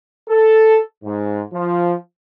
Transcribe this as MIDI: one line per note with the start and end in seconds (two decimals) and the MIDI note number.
0.29 0.79 69
1.04 1.42 44
1.53 1.94 53